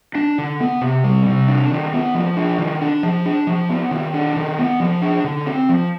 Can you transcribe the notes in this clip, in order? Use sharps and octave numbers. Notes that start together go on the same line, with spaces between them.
D4
D3
B3
C3
G3
C3
D4
D#3
B3
F3
D4
D#3
D4
F3
D4
F3
B3
D#3
D4
D#3
B3
F3
D4
D3
C4
F3